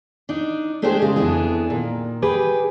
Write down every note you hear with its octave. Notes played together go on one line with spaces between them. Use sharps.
D4 D#4
G#3 A3 D4 G4 G#4 C5
C#3 G#3
F2 B3 D4 E4 G#4
A#2 D#3
G4 G#4 B4